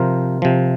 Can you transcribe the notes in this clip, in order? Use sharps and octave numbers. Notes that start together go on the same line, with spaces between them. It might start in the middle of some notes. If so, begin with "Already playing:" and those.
Already playing: C3 F3 A#4 C5
C3 F3